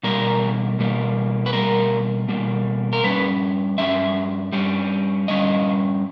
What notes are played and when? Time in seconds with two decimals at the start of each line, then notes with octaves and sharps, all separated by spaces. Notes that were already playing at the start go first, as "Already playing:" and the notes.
0.03 B2 G3 A#3 A#4
0.79 B2 G3 A#3
1.46 B4
1.53 B2 G3 A#3 A#4
2.28 B2 G3 A#3
2.93 A#4
3.03 G2 G3 C#4 B4
3.78 G2 G3 C#4 E5
4.53 G2 G3 C#4
5.28 G2 G3 C#4 D#5